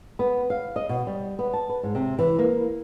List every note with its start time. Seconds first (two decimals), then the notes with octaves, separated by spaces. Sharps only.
0.19 B3
0.50 F5
0.76 D#5
0.89 B2
1.07 G3
1.39 B3
1.53 A5
1.69 B4
1.83 G#2
1.95 C3
2.19 E3
2.39 A#3